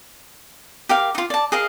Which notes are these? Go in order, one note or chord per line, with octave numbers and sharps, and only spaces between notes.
G4 A#4 F5
D#4 F4
D5 A5
G#4 A#4 D#5 F5